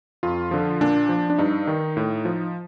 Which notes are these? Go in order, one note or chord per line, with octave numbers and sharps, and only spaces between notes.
F2 F4
D3 F3
A#2 D4
F3
D4
G2 D#4
D#3
A2
F3